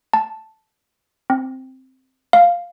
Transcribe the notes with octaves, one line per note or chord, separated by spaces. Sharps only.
A5
C4
F5